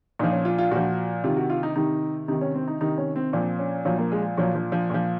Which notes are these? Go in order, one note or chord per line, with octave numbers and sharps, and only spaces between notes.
A#2 F3 D#4
C#4
F4
F4
A#2 F3 F#4
C3 D#3 F4
F#4
F4
D#4
C3 D#3 D#4
C3 D#3 D#4
C#4
C4
D#4
C3 D#3 D#4
C#4
C4
A#2 F3 C4
C#4
A#2 F3 F#3
A#3
G#3
A#2 F3 F#3
F3
F3
A#2 F3